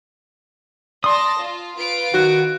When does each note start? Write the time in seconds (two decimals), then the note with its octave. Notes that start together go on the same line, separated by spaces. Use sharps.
1.04 D5 A5 C6 D#6 A#6
1.41 F4
1.76 F4 B4 D7
2.13 D#3 F#4